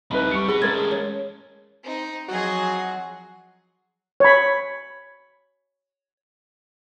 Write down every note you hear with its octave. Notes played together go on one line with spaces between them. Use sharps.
C2 F2 D#4 B4 B5
G3 C#6 C#7
F#4 G#4 B4 B5 G7
G#3 A3 C#4 A#4 G#6 A6
C#5
C4 D#4
F3 F#3 F4 F#4 G#4 D#5
C#5 B5